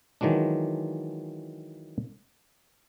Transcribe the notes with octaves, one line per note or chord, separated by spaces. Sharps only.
D#3 E3 F#3 G#3 D4